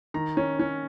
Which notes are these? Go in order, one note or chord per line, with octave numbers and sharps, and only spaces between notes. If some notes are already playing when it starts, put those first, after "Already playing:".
D#3 A#5
C#4
C#4